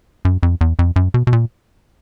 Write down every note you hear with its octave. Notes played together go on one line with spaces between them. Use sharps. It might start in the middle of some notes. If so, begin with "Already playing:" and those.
F#2
F2
E2
F2
F#2
B2
B2
A#2